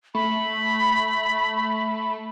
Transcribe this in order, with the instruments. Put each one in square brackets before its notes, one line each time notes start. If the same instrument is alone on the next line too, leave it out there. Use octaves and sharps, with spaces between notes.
[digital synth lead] A3 [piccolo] B5